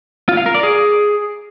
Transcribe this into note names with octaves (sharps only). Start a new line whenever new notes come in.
F4
F5
A#4
D5
G#4